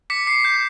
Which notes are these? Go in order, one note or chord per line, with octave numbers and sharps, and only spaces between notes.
D6 B6 C#7
D6 C7
G6